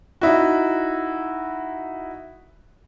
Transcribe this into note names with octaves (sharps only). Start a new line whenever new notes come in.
D#4 E4 F#4